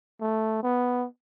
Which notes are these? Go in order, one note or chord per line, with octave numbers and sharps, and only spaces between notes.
A3
B3